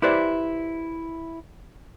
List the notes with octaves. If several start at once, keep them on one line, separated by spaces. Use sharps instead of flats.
E4 G4 B4 C5 D5 E5